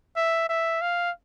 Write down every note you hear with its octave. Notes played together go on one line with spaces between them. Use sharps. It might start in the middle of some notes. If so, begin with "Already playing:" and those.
E5
E5
F5